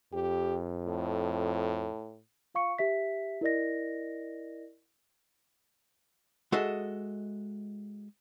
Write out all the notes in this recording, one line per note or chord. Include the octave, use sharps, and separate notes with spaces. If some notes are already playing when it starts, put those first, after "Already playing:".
F2 G4
A2
F4 F5 C#6 C#7
G4 E5 B6
E4 A#4 D5 D#5 A#6
G#3 F#4 A4 D#5 E5